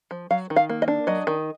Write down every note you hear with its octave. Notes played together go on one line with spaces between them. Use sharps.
F3
F#3 F5
D#3
F5
A#3
D#5
D4
F#3 D#5
D#3